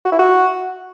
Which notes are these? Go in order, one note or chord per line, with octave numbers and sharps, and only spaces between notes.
F#4
E4
F#4